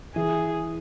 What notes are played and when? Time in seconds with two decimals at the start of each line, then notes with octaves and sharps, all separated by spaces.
0.15 E3 G#4